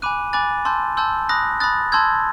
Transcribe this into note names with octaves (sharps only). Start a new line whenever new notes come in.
G#5 B5 D6 F#6 D#7
G#5 B5 D6 F#6 A6
A5 C6 E6 G6
A5 C6 E6 G6
B5 D#6 F#6 A#6
B5 D#6 F#6 A6
A5 C6 E6 G6 G#6